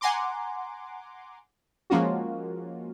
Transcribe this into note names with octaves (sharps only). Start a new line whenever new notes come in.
F#5 G#5 A#5 C6 D6
F3 G#3 A#3 C#4 F4 F#4